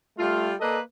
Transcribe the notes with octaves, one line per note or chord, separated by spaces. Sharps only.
G3 A3 F4
A#3 A4 B4 D5 D#5